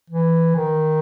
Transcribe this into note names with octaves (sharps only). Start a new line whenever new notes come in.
E3
D#3